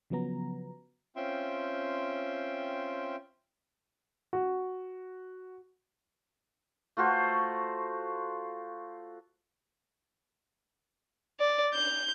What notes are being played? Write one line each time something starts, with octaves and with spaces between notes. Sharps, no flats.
C#3 F3 F#3 B3 A#5
C4 C#4 F4 E5 G5 C6
F#4
A3 F4 F#4 C5
D5
G6